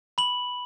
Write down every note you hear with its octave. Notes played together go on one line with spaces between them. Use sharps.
B5 F#7